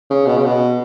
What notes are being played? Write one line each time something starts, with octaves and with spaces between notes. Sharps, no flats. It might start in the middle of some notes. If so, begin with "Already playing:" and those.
C#3
B2
C#3
B2